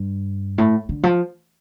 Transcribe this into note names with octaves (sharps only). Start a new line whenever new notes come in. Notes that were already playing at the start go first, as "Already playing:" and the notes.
Already playing: G2
A2
D3
F3